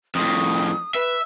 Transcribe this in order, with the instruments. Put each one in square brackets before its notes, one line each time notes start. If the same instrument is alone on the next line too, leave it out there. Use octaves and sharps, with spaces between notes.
[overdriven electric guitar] F2 A2 [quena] D#6
[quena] B4 [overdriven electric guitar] E5